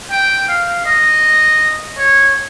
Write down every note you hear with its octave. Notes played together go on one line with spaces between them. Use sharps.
G5
F5
D#5
C#5